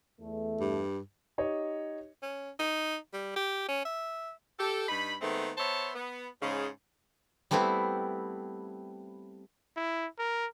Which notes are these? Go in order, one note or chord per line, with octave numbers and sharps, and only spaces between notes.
E2 A3
G2
D#4 G4 C#5 D#5
C#4
D#4
G3
G4
C#4
E5
G4 A4
G2 D#4 B5
D#3 G#3 A3 B3 C4
B3 C5 C#5 E5 A5
B3
G#2 C#3
G3 A3 B3 C4 E4
E4
A#4